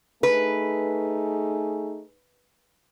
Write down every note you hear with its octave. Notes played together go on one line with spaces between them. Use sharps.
A3 D#4 G#4 B4